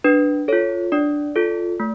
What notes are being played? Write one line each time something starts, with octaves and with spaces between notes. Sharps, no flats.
D4 B4
F4 A4 C#5
D4 D5
F4 A4
A3